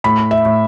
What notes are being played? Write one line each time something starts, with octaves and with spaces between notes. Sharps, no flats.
A2 B5
E5
A2